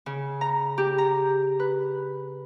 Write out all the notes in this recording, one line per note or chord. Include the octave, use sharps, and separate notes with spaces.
C#3
A#5
G4
A#5
B4